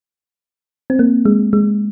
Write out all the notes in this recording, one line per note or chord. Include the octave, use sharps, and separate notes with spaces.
C4
A#3
G#3
G#3